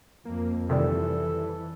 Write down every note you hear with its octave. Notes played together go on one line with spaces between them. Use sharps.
F2 A#3
C3 D#3 E3 G3 A4